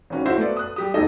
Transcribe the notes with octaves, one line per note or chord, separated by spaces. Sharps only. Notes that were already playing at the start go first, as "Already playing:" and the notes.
G#1 D#3 C#4 F#4
E4 F#4 C5 E5 F5
A3 B3 D5
D#6 F#6
G3 G4 D#6
E1 A1 D#2 D#3 A4 D#5